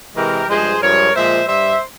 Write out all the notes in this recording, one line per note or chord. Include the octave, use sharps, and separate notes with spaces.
C3 E3 G#3 G4 A#4
G2 F3 G#3 G#4 C5
G2 F3 G#3 A#4 C#5
A#2 F3 G#3 C5 E5
G2 G3 C5 E5